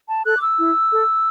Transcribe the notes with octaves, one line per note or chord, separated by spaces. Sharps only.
A5
A4 F#6
D6
E6
E4
A4